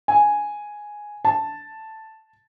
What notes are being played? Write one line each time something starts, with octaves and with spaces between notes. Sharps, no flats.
G#5
A5